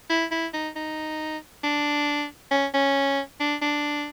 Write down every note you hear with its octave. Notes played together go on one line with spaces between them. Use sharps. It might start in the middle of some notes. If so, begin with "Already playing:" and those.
E4
E4
D#4
D#4
D4
C#4
C#4
D4
D4